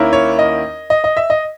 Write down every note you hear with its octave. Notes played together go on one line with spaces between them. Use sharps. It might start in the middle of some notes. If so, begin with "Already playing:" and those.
Already playing: D#2 D#3 A#3 C#4 E4
C#5
D#5
D#5
D#5
E5
D#5